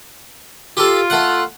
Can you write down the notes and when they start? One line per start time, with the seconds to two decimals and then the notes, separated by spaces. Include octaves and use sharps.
0.77 F4 G4 A4
1.10 A3 F#5